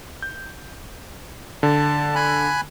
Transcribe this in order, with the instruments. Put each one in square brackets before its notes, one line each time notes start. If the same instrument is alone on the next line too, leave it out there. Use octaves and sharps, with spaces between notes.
[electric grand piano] G6
[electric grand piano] D3 [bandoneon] A5
[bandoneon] G#5 B5 F#6